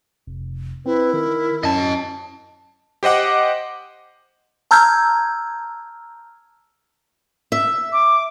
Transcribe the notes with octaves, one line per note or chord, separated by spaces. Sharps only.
F1
C4 E4 B4
D#3 A#4
F#2 C#4 D#5 A5
G4 C5 D#5 F#5 D6
A5 A#5 E6 F6 G6 G#6
E5
D6